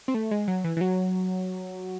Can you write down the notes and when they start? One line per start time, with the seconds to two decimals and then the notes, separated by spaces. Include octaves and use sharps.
0.08 C4
0.14 A3
0.31 G#3
0.48 F#3
0.64 E3
0.77 E3
0.81 F#3